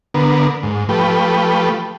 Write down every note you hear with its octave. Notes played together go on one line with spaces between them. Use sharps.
D3 B3 A#4
G#2
F3 A3 G4 B4